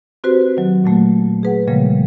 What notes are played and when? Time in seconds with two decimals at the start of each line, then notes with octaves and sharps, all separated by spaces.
0.24 C4 F#4 G4 B4 C5
0.57 D#3 F#3
0.84 A#2 F#3 A3 A#3
1.43 G#4 B4 F#5
1.68 A#2 C#3 F3 G3 G#3 A#3